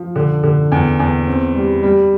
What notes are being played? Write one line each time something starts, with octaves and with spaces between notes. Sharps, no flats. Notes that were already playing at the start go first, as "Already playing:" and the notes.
Already playing: F3
D3
D3
E2
E2
C4
G3
G3